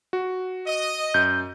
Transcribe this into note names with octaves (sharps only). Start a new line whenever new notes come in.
F#4
D#5
F#2 G6